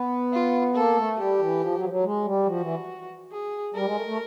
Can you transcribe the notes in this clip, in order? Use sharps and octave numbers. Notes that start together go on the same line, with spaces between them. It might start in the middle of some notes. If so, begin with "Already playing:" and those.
Already playing: B3
F4
A#3 A4
A3
G3 G4
E3
F3
F#3
F3
F#3
G#3
G3
F3 F#4
E3
G#4
G3 A#4
G#3
A3
A3